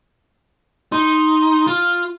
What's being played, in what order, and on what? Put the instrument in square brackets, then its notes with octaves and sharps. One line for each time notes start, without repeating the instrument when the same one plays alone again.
[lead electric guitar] D#4 [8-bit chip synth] C6
[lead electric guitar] F4